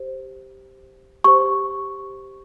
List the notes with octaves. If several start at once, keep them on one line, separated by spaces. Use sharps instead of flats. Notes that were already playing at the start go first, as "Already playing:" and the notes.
Already playing: G4 C5
G4 C5 C#6